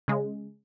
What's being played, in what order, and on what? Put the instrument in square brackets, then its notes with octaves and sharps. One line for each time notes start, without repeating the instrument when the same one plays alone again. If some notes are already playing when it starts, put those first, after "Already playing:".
[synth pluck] C#3 G#3